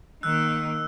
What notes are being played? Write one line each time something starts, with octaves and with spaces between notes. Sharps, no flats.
D#3 A#3 E6 F#6